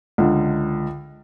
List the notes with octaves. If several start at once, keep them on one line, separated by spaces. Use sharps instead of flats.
C#2 D3